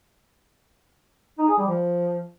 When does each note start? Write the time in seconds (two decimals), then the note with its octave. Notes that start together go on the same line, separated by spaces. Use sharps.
1.38 D#4
1.48 G#4
1.58 G3
1.68 F3